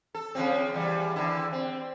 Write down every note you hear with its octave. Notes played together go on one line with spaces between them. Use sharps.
A4
C#3 F3 C4
E2 G3
E2 D3 E4
C4